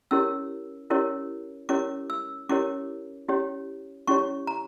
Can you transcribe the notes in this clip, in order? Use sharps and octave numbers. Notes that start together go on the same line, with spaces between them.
C#4 E4 G4 A#4 C#5 E6
C#4 E4 G4 A#4 C#5
C#4 E4 G4 A#4 C#5 D6
E6
C#4 E4 G4 A#4 C#5 D6
C#4 E4 G4 C#5
C#4 E4 G4 C#5 C#6
A#5